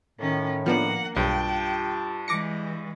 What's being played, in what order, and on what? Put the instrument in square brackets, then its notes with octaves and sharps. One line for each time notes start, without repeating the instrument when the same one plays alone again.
[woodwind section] A2 [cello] D#3 C#4
[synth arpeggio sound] F3 B3 D4 [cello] A#3 F#5
[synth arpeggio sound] B1 [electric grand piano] G2 [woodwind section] F4 G4 A5 [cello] G5
[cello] E3 G#3 [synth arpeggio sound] D6 A#6 C#7